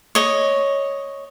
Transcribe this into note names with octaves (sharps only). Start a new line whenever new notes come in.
C#5 D#5